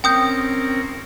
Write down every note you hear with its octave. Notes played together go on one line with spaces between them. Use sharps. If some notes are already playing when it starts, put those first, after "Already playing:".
C4 C#4 A#4 G5 D#6 G6